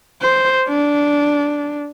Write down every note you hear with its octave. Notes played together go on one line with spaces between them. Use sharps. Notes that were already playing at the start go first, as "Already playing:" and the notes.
C5
D4